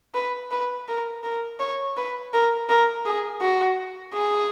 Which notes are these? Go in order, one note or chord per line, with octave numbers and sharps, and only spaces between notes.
B4
B4
A#4
A#4
C#5
B4
A#4
A#4
G#4
F#4
G#4